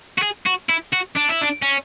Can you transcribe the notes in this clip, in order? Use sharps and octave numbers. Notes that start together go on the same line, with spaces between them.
F#4
G#4
F#4
E4
F#4
D4
E4
D4
C#4